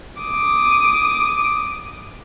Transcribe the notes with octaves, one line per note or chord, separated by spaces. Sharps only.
D6 D#6